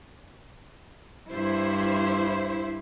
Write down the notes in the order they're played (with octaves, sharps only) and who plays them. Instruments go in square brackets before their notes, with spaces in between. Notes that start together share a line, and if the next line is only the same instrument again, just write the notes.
[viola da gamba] G2 [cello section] E4 C5